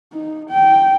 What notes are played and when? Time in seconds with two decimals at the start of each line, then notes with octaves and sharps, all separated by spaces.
0.13 D#4
0.49 G5